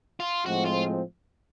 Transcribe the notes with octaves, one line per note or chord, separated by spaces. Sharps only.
F4
A2 F3 G#3 C4 F#4
F4